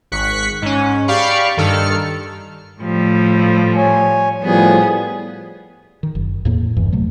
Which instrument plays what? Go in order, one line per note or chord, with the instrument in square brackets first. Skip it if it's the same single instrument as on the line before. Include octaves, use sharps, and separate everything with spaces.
[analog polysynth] G#1 C#6 F#6 B6 C#7
G#2 C#4
G4 D5 F5 B5 C#6
G2 D#3 A4 F6 C#7
[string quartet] A2 F3 G3
[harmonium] C#5 G#5
[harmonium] A2 F3 G3 [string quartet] B3 G#4
[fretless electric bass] D#3
F#1
E2 A2 A#3
G1 E2 G2 E3
D#2 C3 F#3 A3